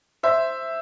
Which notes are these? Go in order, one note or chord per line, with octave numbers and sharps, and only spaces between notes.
C5 E5